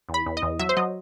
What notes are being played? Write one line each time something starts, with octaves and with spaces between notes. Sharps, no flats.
E2
B5
E2
D#5
E2
F#3 E5
C5
F#3 D#5